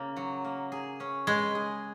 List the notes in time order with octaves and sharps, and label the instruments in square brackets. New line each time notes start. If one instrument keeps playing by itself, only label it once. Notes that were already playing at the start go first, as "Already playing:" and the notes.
Already playing: [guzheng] C#3 A#3
F#3
A#3
G#4
C#4
[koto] G#3 [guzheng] B4
[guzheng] G#4